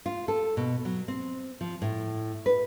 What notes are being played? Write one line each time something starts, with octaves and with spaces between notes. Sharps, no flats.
F4
A4
B2
F#3
C4
F3
A2
B4